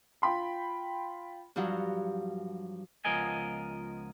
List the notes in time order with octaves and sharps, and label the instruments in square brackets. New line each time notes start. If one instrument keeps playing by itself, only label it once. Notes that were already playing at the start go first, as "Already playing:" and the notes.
[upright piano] F4 G5 B5 C6
[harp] G2 F3 F#3 F#4
[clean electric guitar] C#2 F3 B3 A#4 D#5 G#5